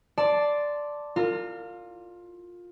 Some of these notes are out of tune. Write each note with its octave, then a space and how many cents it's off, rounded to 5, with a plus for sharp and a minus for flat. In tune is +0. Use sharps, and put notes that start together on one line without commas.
D5 +0 A5 +0 C6 +0
F4 +15 A#4 -35